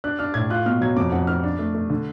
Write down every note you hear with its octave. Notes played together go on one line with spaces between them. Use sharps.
D4 F#6
D4 F6
A2 G#6
F4 F#6
B2 F6
F#3 G#6
F2 D6
F2 F#5
F2 F6
D4
A3
A3
D3